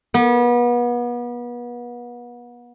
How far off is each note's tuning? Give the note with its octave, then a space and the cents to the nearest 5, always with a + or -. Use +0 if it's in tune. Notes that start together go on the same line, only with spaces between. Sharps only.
B3 -35